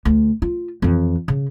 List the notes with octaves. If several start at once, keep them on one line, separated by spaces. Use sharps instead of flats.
D2
F4
F2 E3
C#3